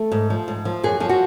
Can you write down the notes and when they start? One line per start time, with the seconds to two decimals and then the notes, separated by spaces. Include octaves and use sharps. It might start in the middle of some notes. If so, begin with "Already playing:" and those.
Already playing: A3
0.12 G#2
0.30 F3
0.48 G#2
0.65 F3
0.83 F#2 G#4
1.00 F3 G#4
1.09 F#4